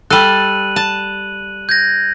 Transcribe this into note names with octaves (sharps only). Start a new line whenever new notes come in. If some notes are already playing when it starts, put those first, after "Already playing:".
G3 A4 F#6 D#7 F#7
A5
G6 G#6 A#6